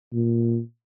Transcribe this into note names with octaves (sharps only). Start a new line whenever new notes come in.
A#2